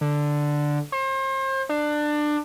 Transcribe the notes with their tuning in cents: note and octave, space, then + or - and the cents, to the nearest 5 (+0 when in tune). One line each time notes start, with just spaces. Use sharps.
D3 +0
C5 +35
D4 +20